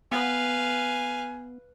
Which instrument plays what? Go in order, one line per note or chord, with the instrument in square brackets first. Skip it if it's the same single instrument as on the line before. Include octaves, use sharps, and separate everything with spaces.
[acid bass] B3 [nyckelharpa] B4 F5 [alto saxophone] G#5